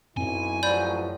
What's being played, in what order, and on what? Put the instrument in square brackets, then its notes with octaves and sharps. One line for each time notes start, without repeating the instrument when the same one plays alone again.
[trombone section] B1 E4 [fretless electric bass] F#2 C4 [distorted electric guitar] G#5
[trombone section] A1 F3 F#3 [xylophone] D5 B5 G6